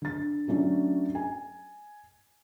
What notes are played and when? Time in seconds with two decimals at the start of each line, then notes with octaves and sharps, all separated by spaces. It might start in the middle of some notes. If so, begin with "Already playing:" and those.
0.02 D3 A6
0.48 F#3 A3 C#4 D4
1.15 G#5